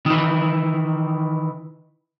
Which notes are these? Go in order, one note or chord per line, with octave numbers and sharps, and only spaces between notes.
D#3 E3